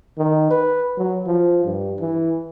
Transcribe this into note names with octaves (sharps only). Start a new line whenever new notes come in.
D#3
B4
F#3
F3
G2
E3